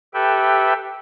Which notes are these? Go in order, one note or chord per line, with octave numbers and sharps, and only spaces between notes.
G4 A4 B4 E5 G5